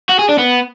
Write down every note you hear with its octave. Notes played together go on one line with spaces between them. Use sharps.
F#4
G#4
D4
B3